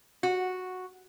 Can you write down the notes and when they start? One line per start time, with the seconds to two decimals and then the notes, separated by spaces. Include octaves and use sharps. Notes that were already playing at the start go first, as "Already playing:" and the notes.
0.23 F#4